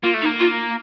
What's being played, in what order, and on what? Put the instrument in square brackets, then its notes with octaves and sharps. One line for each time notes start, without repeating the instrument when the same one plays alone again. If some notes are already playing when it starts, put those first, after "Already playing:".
[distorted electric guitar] A#3 [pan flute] F4
[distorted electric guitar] A3
[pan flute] D#4
[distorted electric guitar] A#3
[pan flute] F4